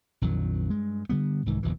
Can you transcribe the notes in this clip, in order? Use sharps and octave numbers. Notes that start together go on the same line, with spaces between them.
A#1 F2 D#3 F#3
G2 G#3
D3 G3 B3
C2 G#2 D#3 E3
F#1 E2 B2 E3